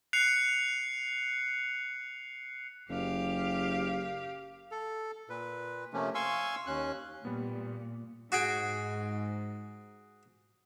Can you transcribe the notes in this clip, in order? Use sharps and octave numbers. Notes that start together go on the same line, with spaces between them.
F#6 C7 C#7 F7
F#1 G4 F5
A4
A#2 B4
C3 F3 A3 A#3 C#4
F5 G#5 C6 C#6 E6
D#2 C#4 F#6
A#2 G3 B3
G#2 F#4 G#4 G5